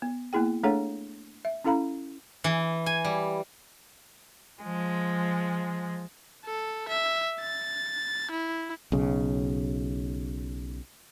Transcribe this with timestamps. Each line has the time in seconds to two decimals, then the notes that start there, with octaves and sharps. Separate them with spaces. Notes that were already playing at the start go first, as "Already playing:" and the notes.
0.02 B3
0.33 A#3 B3 E4 G#4 G5
0.63 A3 D4 G#4 A4 C#5 F#5
1.45 E5
1.65 C#4 E4 A4 F5 A#5 B5
2.44 E3
2.86 G#5
3.05 G3
4.62 F3 G#3
6.45 A4
6.89 E5
7.40 A6
8.31 E4
8.92 B1 C#3